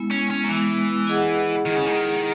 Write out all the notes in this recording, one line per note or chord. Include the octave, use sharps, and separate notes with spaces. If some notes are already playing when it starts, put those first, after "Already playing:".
Already playing: G#3 B3 E4
C#4
C#4
F#3
E3 G#3 B3 E4
E4 G#4 D#5 F#5
D#3 E4 G#4 D#5 F#5
C#3
D#3